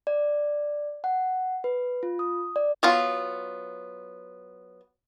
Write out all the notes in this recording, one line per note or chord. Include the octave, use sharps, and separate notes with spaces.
D5
F#5
B4
F4
D#6
D5
F#3 B3 F4